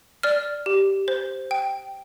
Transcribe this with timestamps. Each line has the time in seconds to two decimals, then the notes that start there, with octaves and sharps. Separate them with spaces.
0.23 D5 F6
0.66 G4
1.08 C5
1.51 G5